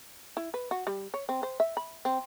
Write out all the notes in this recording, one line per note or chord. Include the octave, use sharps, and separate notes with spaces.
E4
B4
F#4
G3
C#5
C4
C5
E5
B5
C4